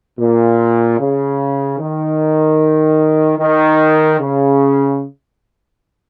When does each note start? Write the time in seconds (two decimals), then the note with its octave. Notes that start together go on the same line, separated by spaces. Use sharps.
0.19 A#2
0.99 C#3
1.79 D#3
3.39 D#3
4.19 C#3